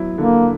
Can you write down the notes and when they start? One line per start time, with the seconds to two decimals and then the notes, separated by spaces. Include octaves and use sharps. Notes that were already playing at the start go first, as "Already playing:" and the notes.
Already playing: F#3 B3 E4
0.18 D3 A#3